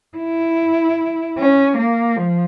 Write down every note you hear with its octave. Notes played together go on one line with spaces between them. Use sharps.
E4
C#4
A#3
F3